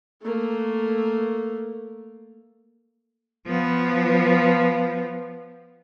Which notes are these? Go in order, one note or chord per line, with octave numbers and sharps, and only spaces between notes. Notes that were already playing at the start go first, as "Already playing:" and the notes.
A3 A#3
F3 B3